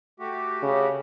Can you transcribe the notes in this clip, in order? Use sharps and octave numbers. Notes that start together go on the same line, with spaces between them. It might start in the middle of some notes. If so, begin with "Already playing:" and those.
A3 F#4 G4
C#3